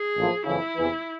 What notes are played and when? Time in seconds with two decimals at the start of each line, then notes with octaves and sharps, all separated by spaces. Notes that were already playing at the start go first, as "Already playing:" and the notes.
Already playing: G#4
0.17 A1 A2 F3 A#3
0.46 F#1 F2 C#3 E3 E4
0.76 E2 C3 E3